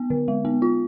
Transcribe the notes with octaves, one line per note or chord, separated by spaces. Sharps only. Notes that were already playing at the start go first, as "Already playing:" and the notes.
Already playing: B3
D3
G#3
B3
F4